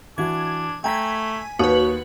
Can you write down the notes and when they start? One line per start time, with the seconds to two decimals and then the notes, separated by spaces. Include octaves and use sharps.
0.18 E3 D4 F#4 G#6
0.84 A3 G5 G#5 A#5 G#6 B6
1.59 D#2 F#4 B4 C#5 D#6